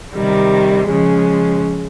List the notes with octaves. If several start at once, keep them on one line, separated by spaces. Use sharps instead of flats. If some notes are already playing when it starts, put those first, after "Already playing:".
C3 D#3 G3
C#3 F3 G#3